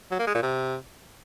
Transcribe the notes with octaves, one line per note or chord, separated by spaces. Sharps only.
F#3
A#3
G#3
A#2
C3